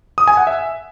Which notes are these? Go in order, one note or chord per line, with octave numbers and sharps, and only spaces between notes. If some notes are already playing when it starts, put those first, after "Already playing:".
D#6
G#5
F#5
E5